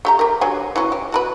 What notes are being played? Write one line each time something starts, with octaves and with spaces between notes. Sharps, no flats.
A3 G4 A#5
G4 A#4
D3 F#3 G#5
E3 F#3 C#4
G4
F#4 A#4 B4